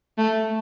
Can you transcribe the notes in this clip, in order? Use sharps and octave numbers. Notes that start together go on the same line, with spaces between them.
A3